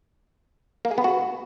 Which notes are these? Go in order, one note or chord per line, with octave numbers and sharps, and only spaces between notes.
A#3
G#4
B3
F#4